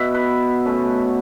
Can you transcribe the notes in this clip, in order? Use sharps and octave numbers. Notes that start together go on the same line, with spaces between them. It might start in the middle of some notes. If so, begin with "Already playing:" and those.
Already playing: B2 B3 E5 F#5
B4
B2 A3 C#4